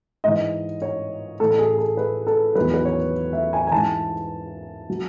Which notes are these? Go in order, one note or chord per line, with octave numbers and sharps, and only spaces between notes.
G#2 E3 D#5
C#5
A2 E3 A4
A4
G#4
A4
B4
A4
E2 D#3 F#3 B4
B4
C#5
E5
G#5
G#5
G#2 E3 A5
F#3